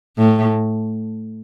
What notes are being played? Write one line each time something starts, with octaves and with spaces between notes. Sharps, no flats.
A2